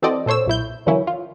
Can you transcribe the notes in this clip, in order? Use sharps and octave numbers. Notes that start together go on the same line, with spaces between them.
E3 C4 F#4 A4 D5 D#5
A#2 A4 C5 C#5 E6
B1 A#2 E4 G6
D3 E3 F#3 A#3 C#4 E4
F4